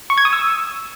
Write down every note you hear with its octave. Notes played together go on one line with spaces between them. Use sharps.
C#6
G#6
D#6
E6